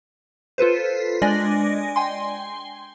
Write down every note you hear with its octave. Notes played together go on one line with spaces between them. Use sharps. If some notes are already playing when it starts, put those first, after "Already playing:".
F4 A4 B4 C5
G#3 D4 D5 D#5 G#5 A#6
G5 G#5 C6